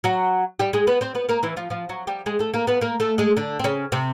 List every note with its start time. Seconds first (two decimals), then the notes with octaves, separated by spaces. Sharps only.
0.04 F#3 F#4
0.59 G3 G4
0.73 G#3 G#4
0.87 B3 B4
1.01 C4 C5
1.15 B3 B4
1.29 A#3 A#4
1.43 E3 E4
1.57 F3 F4
1.70 F3 F4
1.89 F#3 F#4
2.07 G3 G4
2.26 G#3 G#4
2.39 A3 A4
2.54 A#3 A#4
2.67 B3 B4
2.81 A#3 A#4
3.00 A3 A4
3.18 G#3 G#4
3.37 D3 D4
3.59 C4
3.64 C#3 C#4
3.92 C3 C4